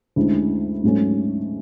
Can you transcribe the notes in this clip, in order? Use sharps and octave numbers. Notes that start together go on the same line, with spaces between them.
D2 D3 G#3 C#4 E4
G#2 F#3 A3 C#4